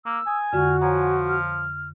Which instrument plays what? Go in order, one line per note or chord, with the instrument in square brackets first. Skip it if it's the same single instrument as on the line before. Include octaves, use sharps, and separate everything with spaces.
[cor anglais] A#3 [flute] E6
[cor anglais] G#5 [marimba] D#6
[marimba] F2 D3 G#3 [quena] F#4 [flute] F6
[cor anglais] F3 [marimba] C#5 F#5 A#5 [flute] G#5
[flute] F6